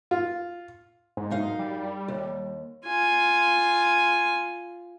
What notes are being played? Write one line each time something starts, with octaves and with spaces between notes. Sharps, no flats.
F4
G#2
F#2 D#4 F5
G3
D#2
F4 G#5